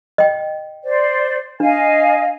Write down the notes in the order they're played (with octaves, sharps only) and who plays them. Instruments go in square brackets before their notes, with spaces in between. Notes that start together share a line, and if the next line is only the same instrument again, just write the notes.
[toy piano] D#5 G5
[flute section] C5 D5
[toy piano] D4 [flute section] D#5 F5 G#5